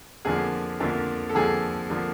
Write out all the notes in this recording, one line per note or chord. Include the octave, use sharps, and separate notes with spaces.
F2 D3 F3 A#3 G#4
F2 D3 F3 A#3
A4
F2 D3 F3 A#3 G#4
D3 F3 A#3